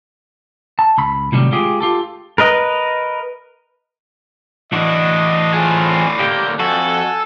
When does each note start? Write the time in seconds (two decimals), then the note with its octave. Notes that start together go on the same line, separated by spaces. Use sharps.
0.79 A5
0.98 C#2 B5
1.32 A2 C3 D#3 F#3 G3
1.52 G#3 F4 G4 G#4
1.80 F4 G4 A4
2.38 A#4 B4 D#5
4.73 A2 E3 D4 F#4 D#5
5.54 C4 F4 G#4
6.19 D3 A#3 G4 G6
6.59 F2 F#4 A4 G#5